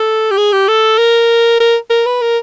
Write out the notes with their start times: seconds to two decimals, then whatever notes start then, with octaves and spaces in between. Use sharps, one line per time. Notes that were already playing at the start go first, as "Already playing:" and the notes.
Already playing: A4
0.31 G4
0.37 G#4
0.52 G4
0.68 A4
0.98 A#4
1.60 A#4
1.90 A#4
2.06 B4
2.22 A#4